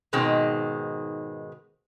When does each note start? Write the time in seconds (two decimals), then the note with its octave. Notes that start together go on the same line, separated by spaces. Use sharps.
0.13 G#2 B2 D#3 G#3 C4